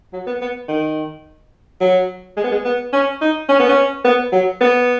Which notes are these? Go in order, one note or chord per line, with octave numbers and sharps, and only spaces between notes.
F#3
B3
B3
D#3
F#3
G#3
B3
G#3
B3
C#4
D#4
C#4
B3
C#4
B3
F#3
B3